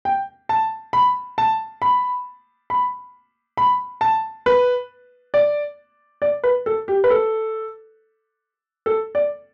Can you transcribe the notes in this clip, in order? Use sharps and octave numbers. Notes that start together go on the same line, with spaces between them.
G5
A5
B5
A5
B5
B5
B5
A5
B4
D5
D5
B4
A4
G4
B4
A4
A4
D5